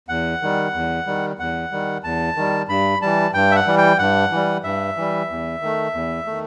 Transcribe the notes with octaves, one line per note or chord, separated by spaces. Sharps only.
E2 F#5
D#3 G3
E2
D#3 G3
E2 F#5
D#3 G3
E2 A5
D#3 G3
G2 B5
E3 G3 A5
G2 G5
E5
F#5
E3 G3
G5
G2 F#5
E3 G3
G2 E5
E3 G3
E2
D#3 A3
E2
D#3 A3